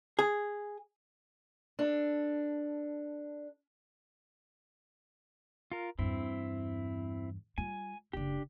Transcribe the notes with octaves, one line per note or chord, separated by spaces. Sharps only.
G#4
D4 A4
F4 A#4
E2 G2 C4 E4
G3 F4 G#5
F#1 C#3 D4 G4